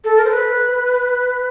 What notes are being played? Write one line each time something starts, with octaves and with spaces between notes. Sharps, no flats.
A4
A#4
C5
B4